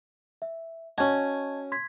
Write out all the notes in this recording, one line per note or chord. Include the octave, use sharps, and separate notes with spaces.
E5
C#4 F#4 D#5 A5 G#6
C6 G#6 B6